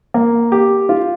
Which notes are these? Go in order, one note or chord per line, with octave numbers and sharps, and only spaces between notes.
A#3
G4
F4